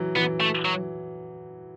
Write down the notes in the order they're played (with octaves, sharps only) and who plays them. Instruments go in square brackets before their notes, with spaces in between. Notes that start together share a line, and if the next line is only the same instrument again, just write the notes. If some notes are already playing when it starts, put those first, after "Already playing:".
Already playing: [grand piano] E3 F#3
[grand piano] E3 [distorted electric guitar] B3
[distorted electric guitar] A3
F#3